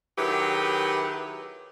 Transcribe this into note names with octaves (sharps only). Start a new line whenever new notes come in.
D#3 F#3 E4 G4 G#4 B4